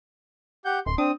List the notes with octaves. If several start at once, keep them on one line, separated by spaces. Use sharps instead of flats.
G4 F#5 G6
D1 C6
C4 D4 D#6